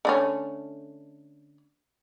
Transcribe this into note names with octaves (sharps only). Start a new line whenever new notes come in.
D3 A3 C#4